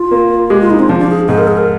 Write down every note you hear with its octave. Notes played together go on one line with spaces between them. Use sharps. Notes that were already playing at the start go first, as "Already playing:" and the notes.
Already playing: F4
A#3
G#3 G4
F4
D#4
C4
F3 D4
D4
G#4
G#2 G#4
A#4
G#4
A#4